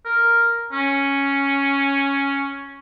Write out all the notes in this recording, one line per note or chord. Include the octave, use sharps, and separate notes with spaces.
A#4
C#4